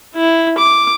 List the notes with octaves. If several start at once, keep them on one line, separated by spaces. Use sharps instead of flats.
E4
D6